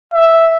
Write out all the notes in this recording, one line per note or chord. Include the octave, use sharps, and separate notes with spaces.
E5